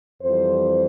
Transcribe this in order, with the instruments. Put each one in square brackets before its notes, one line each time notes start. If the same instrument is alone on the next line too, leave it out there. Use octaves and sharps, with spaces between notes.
[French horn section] F2 E3 G3 C5